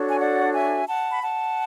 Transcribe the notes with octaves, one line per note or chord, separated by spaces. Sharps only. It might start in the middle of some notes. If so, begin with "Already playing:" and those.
Already playing: D4 F#4 A4 C#5
G#5
D5 F#5
E5 G#5
F#5 A5
B5
F#5 A5